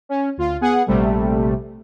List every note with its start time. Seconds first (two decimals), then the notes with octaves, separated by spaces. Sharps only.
0.09 C#4
0.37 D2 F4
0.61 B3 G#4 F#5
0.86 A#1 C3 G3 A3